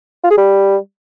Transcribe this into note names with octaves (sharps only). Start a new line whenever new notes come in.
F4
G#4
G3